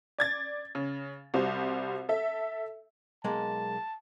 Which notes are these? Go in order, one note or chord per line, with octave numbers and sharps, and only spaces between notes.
D5 G#6 A6
C#3
C2 G3 F#4 C5
A4 E5
B1 G#3 A#3 A5